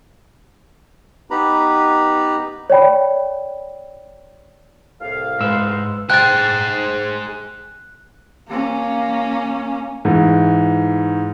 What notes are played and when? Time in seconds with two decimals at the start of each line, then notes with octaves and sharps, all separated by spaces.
1.31 B3 D#4 G4 B4 A#5 B5
2.70 C#5 D5 G5 B5
5.01 C2 A2 F5
5.41 G#2 B4 E6
6.10 G#4 C5 G5 F#6 A6
8.50 A#3 C#4
10.05 G#2 E3